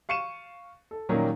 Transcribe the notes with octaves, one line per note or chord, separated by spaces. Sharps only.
F5 C#6 C#7 D#7 E7
A4
A#2 D#3 F#3 G3 A#3 C#4